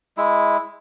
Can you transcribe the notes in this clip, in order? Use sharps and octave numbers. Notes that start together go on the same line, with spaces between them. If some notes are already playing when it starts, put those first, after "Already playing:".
G#3 E4